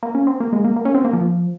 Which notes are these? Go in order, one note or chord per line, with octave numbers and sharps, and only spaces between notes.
A#3
C#4
C4
A#3
G#3
A#3
A#3
C#4
C4
A#3
F3